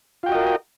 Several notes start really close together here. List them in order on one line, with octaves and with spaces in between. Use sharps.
F4 G5 F#4 D#5 A#4